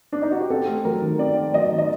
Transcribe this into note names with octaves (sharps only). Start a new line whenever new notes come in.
D4
D#4
F#4
G4
C4 A4
A3
F#3 A#4
D#3
C4 D5
A3
F#3 D#5
D#3
D#5